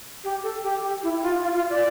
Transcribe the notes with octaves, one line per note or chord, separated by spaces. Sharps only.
G4
A4
G4
G4
E4
E4
F4
F4
F4
D5